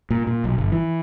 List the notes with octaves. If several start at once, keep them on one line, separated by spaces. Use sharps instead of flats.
A#2
A#2
B1
G1
E3